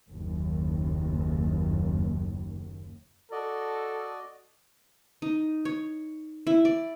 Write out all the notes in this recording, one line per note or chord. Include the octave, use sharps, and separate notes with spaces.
F#1 D#2
F#4 A4 D5 D#5
D#4
C#5
E4
D5